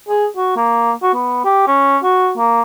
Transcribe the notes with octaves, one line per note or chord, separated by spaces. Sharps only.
G#4
F#4
A#3
F#4
B3
G4
C#4
F#4
A#3